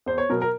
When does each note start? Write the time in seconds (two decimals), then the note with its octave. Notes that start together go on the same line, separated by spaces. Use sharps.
0.06 E2 C5
0.18 C#5
0.30 B2 F#3 A#4
0.42 A#4